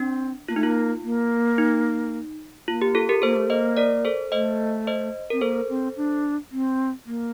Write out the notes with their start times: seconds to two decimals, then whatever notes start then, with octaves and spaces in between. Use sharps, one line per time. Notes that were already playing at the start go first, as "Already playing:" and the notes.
Already playing: C4 D4
0.48 A#3 F4
0.56 A3 D#4
0.63 A#3 F4
1.03 A#3
1.58 D#4
2.67 A#3 F4
2.82 G4
2.95 F4 A4
3.09 G4 A#4
3.22 A#3 A4 C5
3.36 A3
3.48 A#3 C5 D#5
3.77 A#4 D5
4.05 A4 C5
4.32 A3 C5 D#5
4.87 C5 D#5
5.30 C4 A#4
5.41 A#3 A4 C5
5.69 C4
5.97 D4
6.51 C4
7.06 A#3